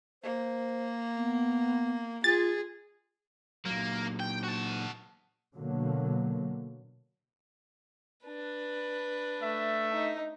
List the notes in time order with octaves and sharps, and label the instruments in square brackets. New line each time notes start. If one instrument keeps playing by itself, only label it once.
[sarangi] A#3 [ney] C5
[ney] B3
[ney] F4 [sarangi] G#4 [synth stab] A6
[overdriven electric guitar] A#2 F#3 [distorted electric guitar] A#3
[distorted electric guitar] G5
F#4 A5
[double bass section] B2 D3 F#3 A#3
[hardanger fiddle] D4 B4
[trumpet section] A3 E5
[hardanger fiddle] D#4